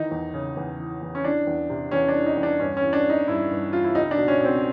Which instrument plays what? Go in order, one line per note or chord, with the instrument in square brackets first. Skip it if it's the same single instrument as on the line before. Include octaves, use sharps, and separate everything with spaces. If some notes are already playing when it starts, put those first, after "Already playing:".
Already playing: [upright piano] D#3 E3 D#4
E2
C#3
E2
E3
E2
C#4
E3 D4
E2
C3
E2 C#4
D4
E3
D#4
E2
D4
G2 C#4
C#4
E3
D4
E3
D#4
G2 E4
G2
E3 F4
E4
C#2 D#4
D4
B2
C#4
B2 C4